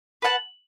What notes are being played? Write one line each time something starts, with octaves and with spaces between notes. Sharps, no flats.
B4 F#5 A5